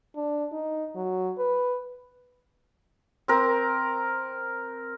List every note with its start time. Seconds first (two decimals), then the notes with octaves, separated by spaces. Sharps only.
0.16 D4
0.52 D#4
0.95 F#3
1.38 B4
3.28 C4 A#4